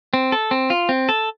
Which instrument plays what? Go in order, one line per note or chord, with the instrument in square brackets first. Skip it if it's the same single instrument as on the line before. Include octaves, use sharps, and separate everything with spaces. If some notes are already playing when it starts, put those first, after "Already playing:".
[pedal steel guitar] C4
A4
C4
F4
C4
A4